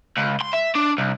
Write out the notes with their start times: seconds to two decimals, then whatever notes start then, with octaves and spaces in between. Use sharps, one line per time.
0.17 C#2
0.41 C6
0.53 E5
0.75 D4
0.98 C2